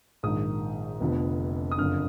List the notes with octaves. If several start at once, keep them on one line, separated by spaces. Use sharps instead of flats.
A#1 G#2 D#3 D#6
F1 F2 D3 F3 B3
D#6
F#1 F2 D3 F6